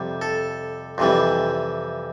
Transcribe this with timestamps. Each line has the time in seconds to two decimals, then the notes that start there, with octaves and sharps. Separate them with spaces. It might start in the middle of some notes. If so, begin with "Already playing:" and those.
Already playing: F2 C3 G3
0.22 A4
0.98 F2 C3 E3 G3